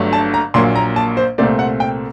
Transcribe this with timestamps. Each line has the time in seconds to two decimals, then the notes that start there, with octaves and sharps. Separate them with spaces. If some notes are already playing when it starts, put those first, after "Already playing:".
Already playing: G1 G2 F#3 A3
0.13 A5
0.34 A#5
0.54 A#1 A#2 F#3 A#3 C6
0.75 A#5
0.96 A5
1.17 C5
1.38 C2 A#2 A3 C4 D5
1.59 F#5
1.80 G5